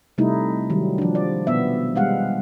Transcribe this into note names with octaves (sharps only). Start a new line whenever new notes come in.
C3 G3 A3 D#4 E4
D#3 F#3 G3
F3 D4
D5
B2 B3 E5
G3 G#3 F5 F#5